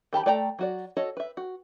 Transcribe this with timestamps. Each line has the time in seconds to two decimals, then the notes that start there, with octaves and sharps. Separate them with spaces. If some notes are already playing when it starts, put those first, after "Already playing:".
0.13 D#3 G4 A5 B5
0.26 A3 D5 G5 A#5
0.59 F#3 F#4 D5
0.97 F#4 A4 C#5 D#5
1.17 B4 E5
1.37 F#4